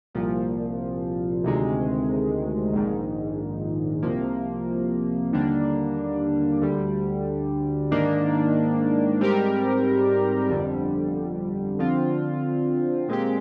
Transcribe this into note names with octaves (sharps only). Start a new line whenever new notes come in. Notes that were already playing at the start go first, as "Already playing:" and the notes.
C2 A#2 F3
D2 C3 D#3 G#3
A#1 G#2 D#3
C2 C3 F3 A#3
D#2 D3 G3 A#3 D4
D2 D3 G3
G#2 D#3 A#3 D4
G#2 G3 C4 G4 A#4
G1 F2 D3 G3
D3 F3 C4 F4
A#2 G#3 C4 G4